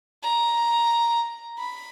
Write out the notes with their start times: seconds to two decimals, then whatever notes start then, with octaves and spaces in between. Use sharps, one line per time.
0.23 A#5
1.58 B5